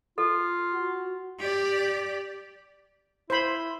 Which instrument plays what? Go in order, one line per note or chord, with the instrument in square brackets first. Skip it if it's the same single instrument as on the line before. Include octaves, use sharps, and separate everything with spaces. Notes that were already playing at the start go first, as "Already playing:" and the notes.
[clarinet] F4 [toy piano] A4
[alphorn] F#4
[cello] G4 D5
[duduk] E4 [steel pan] C5 B5